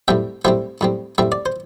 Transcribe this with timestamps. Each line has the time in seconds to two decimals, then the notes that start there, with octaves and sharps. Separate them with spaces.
0.08 A2 G3 C4 E5 G5
0.45 A2 G3 C4 C5 E5
0.81 A2 G3 C4
1.18 A2 G3 C4 E5
1.32 D5
1.46 C5